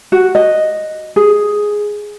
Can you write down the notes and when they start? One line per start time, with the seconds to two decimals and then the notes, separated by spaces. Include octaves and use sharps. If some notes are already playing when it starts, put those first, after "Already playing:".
0.12 F#4
0.35 D#5
1.16 G#4